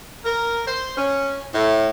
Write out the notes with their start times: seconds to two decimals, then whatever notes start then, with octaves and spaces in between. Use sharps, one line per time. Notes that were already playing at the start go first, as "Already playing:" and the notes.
0.25 A#4
0.65 C5
0.97 C#4
1.53 A2